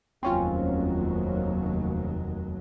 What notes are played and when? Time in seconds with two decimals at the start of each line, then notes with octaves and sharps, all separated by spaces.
0.23 F1 D#2 F#3 C4 C#4 F4